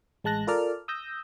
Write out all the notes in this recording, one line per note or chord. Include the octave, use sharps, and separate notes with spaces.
A1 G#3 A5 F#6 A#6
F4 A4 A#4 D5 F6
D#6 E6 G6 A#6